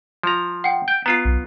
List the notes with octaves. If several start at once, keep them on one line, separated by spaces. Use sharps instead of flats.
F3 A#5
F#5 G5
G5 G6
B3 F4 A#5 A6 C7
B1